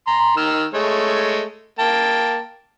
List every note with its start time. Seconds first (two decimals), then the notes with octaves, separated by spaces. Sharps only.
0.07 A#5 C6
0.37 D#3 E6 F6
0.74 G#3 A3 C#5
1.79 A#3 G5 A5